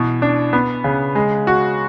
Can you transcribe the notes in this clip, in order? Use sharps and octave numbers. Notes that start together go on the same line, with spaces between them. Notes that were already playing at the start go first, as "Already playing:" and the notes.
Already playing: B2 E3
D4
B3
C#3
G#3
F#4